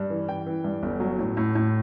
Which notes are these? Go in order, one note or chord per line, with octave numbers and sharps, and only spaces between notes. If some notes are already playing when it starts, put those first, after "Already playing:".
Already playing: G2
E3
E3 G5
E3
G2
G1
F#3
A2
A2
A2